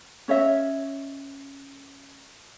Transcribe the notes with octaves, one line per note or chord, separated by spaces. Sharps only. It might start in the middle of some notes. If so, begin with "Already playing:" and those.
C#4 C#5 D#5 E5